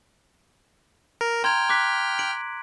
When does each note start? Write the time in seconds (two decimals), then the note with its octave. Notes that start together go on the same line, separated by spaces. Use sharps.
1.21 A#4
1.44 G5 A#5 C6 F6 G#6
1.69 D6 F#6 B6
2.19 D7 F#7